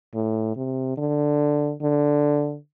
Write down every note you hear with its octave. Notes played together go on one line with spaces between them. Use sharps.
A2
C3
D3
D3